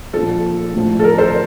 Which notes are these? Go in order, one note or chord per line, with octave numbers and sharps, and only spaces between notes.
A#2 F3 A4
A2 F3
A4
A#4
A4 C5